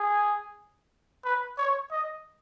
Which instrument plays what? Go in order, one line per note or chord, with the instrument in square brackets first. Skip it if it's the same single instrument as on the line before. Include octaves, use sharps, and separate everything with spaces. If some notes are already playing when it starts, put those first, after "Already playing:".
Already playing: [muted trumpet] G#4
B4
C#5
D#5